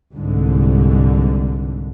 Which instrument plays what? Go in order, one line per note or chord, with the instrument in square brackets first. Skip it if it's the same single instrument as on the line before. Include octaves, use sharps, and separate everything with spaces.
[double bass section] C2 G#2 D3